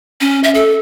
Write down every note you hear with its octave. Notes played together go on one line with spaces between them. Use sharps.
C#4
E5
A4